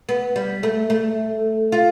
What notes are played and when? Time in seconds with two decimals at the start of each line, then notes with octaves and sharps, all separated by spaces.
0.09 B3
0.36 G3
0.63 A3
0.90 A3
1.72 F4